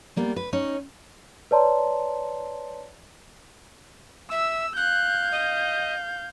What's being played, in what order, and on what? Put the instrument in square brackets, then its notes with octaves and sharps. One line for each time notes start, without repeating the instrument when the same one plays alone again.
[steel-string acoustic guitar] G3 A#3 B3
B4
C#4 D#4
[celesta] B4 C#5 D5 A5 A#5 C6
[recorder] E5 [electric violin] E6
[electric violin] F5 G6 [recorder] F#6
[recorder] D#5